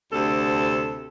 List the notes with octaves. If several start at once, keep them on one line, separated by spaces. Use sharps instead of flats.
D2 C3 A4